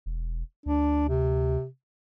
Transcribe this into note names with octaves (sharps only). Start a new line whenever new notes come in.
E1
D2 D4
C3